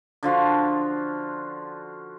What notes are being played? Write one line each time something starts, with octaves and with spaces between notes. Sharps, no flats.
D3 F3 F4 F#4